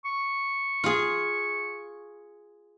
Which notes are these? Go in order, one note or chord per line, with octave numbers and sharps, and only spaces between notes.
C#6
F4 G#4